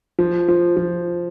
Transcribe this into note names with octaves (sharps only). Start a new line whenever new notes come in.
F3
F3
F3